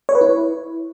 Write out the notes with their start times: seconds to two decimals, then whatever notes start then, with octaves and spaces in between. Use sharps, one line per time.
0.09 C#5
0.15 B4
0.21 E4